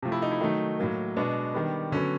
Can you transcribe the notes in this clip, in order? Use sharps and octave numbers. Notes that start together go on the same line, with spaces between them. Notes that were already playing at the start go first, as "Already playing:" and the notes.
C3 F3 A3
E4
D#4
E4
D#3 F#3 A3 D#4
A2 F#3 A#3
B2 G#3 B3 D4
D#3 G3 B3
D3 F#3 B3 C#4